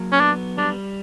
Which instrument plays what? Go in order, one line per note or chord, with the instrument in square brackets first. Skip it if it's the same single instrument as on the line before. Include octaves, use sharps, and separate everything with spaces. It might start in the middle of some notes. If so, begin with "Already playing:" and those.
Already playing: [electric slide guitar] F#3 A#3
[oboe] C#4
[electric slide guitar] B3 [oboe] D4
[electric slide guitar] G3 [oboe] D4